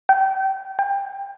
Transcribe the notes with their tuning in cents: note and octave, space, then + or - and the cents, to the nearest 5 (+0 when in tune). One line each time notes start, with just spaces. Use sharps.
G5 -30
G5 +25